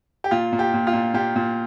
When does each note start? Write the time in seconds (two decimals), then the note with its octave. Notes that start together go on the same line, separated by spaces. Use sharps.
0.24 G4
0.31 A#2 F4
0.52 A#2
0.59 G4
0.73 A#2
0.87 F4
0.93 A#2
1.14 A#2 G4
1.36 A#2